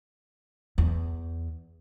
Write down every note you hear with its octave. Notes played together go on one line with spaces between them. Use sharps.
E2